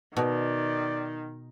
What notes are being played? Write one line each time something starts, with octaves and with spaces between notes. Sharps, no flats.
B2 D#3 D5